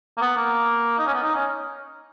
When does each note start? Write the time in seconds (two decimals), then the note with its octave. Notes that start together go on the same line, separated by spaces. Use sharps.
0.18 A#3
0.22 B3
0.37 A#3
0.99 D#4
1.07 C#4
1.14 B3
1.24 D#4
1.35 C#4